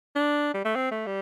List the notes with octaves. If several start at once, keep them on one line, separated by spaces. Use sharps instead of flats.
D4
G3
A3
C4
A3
G3